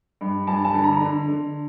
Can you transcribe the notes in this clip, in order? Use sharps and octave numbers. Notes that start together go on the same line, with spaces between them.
G2
G2 A5
A5
D3
A#5
D3
D3